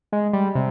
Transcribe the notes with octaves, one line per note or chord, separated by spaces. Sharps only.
G#3
G3
C3